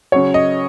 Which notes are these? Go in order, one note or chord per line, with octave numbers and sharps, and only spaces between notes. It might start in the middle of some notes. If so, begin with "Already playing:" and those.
C#3 F#3 C#5
D#5